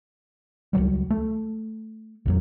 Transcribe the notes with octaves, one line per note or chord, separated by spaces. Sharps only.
C#2 G2 F#3 G3
A3
A#1 F2 F#3